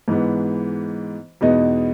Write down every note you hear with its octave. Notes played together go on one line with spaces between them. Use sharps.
G#2 E3 G#3 B3
E2 B2 G#3 B3 D#4